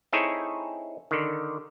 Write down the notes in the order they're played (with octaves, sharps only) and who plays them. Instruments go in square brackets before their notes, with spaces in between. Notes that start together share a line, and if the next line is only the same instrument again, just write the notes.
[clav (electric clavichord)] C4 D#4 E4 G#4 A4 C#5
D3 D#3